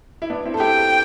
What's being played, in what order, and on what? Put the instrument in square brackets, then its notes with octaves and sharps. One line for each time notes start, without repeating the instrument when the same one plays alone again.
[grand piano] E4
B3 D4
C4 E4
A4
[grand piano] E4 G4 [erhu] G5